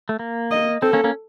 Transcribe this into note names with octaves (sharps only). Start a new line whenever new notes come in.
A3
A#3
D#5
C4 A4
A#3 C#4
A#3 C#4